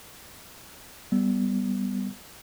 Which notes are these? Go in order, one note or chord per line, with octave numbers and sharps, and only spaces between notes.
G3 B3